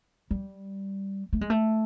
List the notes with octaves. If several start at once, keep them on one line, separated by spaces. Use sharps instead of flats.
G3
A3
G#3
A3